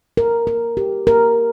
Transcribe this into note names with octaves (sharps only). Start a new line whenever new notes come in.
A#4
A#4
G4
A#4